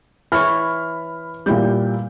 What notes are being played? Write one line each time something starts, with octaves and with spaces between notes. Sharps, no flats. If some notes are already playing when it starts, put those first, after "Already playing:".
E3 C#5 B5 F6
A#2 G3 E4 G6